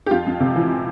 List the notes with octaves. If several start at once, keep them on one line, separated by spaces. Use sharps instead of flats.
G4
F2 F4
F2
C3
E3